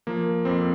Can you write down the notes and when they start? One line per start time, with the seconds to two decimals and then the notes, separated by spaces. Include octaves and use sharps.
0.07 F3 A#3
0.45 F2 C4